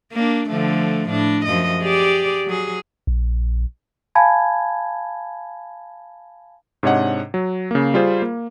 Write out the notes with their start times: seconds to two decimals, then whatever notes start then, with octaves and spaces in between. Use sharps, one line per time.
0.13 A#3 D4
0.49 D3 F3 A3
1.10 A2 D4
1.45 F#2 F3 D#5
1.82 G4 G#4 D5
2.45 F#3 G#4
3.07 A#1
4.15 F5 G#5 A5 B5 G#6
6.83 G#2 C3 D4 C#5 D#5 F#5
7.34 F#3
7.71 C#3 A#3
7.94 G3 F4 G#4 C5
8.22 A#3